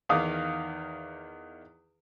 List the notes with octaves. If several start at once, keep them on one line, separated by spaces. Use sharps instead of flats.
E2 D#3 D#4 F5 D6 D#6